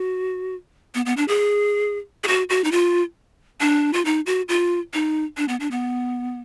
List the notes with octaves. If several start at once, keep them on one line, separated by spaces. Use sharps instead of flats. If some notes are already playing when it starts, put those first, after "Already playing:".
Already playing: F#4
B3
B3
D4
G#4
G#4
F#4
F#4
D#4
F4
D4
F4
D#4
F#4
F4
D#4
D4
B3
D4
B3